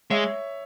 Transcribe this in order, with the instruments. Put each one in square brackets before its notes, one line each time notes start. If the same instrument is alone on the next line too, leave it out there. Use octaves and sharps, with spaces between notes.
[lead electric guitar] G#3 [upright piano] C#5 E5